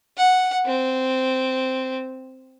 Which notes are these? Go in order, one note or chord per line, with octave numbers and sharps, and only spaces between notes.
F#5
C4